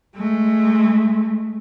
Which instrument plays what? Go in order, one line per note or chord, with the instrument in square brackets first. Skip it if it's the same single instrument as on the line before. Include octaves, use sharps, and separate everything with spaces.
[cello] G#3 A3